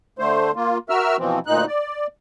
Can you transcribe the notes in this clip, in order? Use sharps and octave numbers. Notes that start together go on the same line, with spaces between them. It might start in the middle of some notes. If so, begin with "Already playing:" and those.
D3 A3 C5
A#3 F4
F#4 A#4 E5 E6 F6
B2 E3 F3 C4
D2 A#2 D#4 F#6
D5